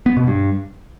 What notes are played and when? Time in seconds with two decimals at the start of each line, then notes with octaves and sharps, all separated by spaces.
0.06 B3
0.17 B2
0.27 G2